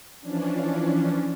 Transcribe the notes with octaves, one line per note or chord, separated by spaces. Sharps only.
E3 F3 C#4 D4